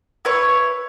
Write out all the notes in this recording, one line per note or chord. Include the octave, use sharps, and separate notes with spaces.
E4 B4 C#5 C#6